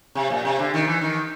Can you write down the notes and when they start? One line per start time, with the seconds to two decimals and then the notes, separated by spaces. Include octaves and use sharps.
0.15 C3
0.30 A#2
0.45 C3
0.59 D3
0.74 D#3
0.87 E3
1.01 D#3